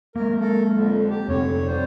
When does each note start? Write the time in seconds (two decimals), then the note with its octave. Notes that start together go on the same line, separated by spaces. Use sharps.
0.16 G#3 A#3 A#4
0.41 A4 A#4
0.73 F2 D3
1.10 G4
1.28 F1 D3 F#3 C4 C#5
1.67 G3 C5